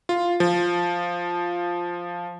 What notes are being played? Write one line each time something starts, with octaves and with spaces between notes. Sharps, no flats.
F4
F3